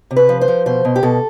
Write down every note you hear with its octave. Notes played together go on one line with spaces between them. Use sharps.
C3
B4
F3
C5
F3
B2 C5
B2
G4
B2 A4